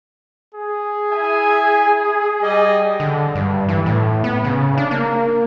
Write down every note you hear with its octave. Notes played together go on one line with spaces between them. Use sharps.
G#4
E4 E5 G#5
G3 D#5
D3
G2
E3
A2
B3
C#3
D4
A#3